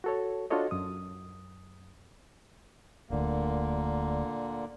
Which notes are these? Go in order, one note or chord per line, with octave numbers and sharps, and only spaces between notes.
F#4 A4 C#5
D4 F4 F#4 A4 C#5 D#5
F#2 D#6
D1 D2 A#2 D3 A#3